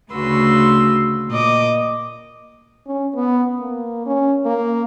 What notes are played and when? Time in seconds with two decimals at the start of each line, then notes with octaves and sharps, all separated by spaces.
0.12 D2 C#3 F#4 B4 C6 E6
1.30 A#2 D#5 D6
2.86 C#4
3.16 B3
3.59 A#3
4.06 C#4
4.46 A#3